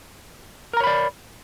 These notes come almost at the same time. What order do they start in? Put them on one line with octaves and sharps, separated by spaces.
A#4 A#5 C#5 B5 D5